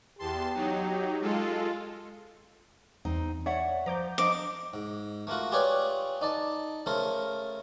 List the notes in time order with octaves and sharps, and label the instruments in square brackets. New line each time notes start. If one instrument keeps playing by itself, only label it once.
[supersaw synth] E2 A5 C6 [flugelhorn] G4
[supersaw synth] F#3 D#4
G#3 F4 A4
[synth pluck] E2 [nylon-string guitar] C4 D#4
[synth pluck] C#5 [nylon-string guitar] D5 E5 F#5
[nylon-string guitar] F3 [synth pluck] A#5 D6 G6
[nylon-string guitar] F3 D4 [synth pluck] D#5 A#5 [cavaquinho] D6
[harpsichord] G#2
A3 A#3 F4 F#4
F4 G4 G#4 B4 C#5 D5
D#4 D5 A5
C#3 A3 A4 A#4 C5